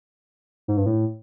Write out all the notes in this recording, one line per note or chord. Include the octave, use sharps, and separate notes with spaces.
G#2
G2
A2